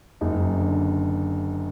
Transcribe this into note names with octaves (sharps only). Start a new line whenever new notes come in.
F#1 D#4
F#2
D3